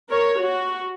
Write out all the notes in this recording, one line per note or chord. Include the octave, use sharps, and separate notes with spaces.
A#4 C#5
F#4